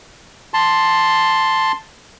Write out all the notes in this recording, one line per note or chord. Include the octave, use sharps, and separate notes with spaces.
A5 C6